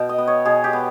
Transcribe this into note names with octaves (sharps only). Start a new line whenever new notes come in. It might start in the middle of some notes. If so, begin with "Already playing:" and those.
Already playing: B2 G5
D#5
B3
C#5
B2 G#4
G4
B3